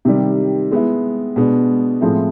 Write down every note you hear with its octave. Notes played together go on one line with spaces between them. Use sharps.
C3 D#3 G3
G#3 B3 E4
B2 G#3 B3 D4
A2 F3 G#3 C4 E4